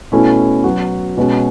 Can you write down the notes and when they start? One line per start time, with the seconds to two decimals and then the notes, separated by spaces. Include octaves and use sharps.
0.12 B2 A3 C#4 E4
0.64 F#3 B3 F#4
1.17 B2 G#3 C#4 F#4